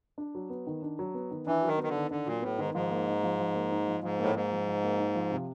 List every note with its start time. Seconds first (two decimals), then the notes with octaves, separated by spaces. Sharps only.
0.18 D4
0.35 F#3
0.50 B3
0.67 D#3
0.82 D4
0.99 F#3
1.15 B3
1.31 D#3
1.47 E3 D4
1.63 D#3 F#3
1.78 B3
1.83 D#3
1.89 D3
1.95 D#3
2.11 D3 D4
2.26 A#2 F#3
2.42 A2 B3
2.59 G#2 D#3
2.74 G#2 F3
2.91 A#3
3.07 D#4
3.24 F3
3.39 F3
3.55 A#3
3.71 D#4
3.88 F3
4.03 G#2 F3
4.19 A2 A#3
4.35 G#2 D#4
4.51 F3
4.67 F3
4.84 A#3
5.00 D#4
5.15 F3
5.31 C3